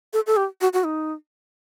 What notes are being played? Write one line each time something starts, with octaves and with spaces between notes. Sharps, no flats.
A4
A4
G4
F#4
F#4
D#4